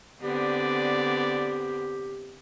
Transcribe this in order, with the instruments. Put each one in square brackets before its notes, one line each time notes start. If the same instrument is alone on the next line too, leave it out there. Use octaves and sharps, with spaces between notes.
[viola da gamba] D3 B3 C4 [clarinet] G4 [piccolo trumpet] D5